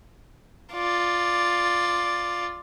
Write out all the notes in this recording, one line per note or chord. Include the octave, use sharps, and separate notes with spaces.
F4 D5